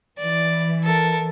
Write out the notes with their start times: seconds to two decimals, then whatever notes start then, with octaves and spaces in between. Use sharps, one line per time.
0.19 E3 D5
0.83 A4 A#4